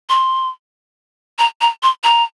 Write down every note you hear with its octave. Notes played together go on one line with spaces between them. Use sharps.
C6
A#5
A#5
C6
A#5